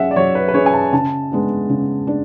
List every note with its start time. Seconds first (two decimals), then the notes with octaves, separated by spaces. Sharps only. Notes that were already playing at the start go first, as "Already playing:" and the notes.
Already playing: F#3 C#4 G#4 E5 F#5
0.11 D5
0.16 F#3 C#5
0.35 B4
0.48 B4
0.54 C#4 G#4 C#5
0.66 G#5
0.74 A5
0.93 C#3 A5
1.32 G#3 B3 D4
1.69 C#3
2.07 D4